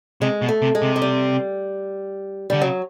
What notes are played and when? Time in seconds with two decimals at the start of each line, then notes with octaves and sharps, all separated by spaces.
0.21 C3 G#3
0.42 B2
0.49 A3
0.62 C3
0.75 G#3
0.82 C3
0.96 G#3
1.02 G3
2.50 D3 G3
2.61 C#3 F#3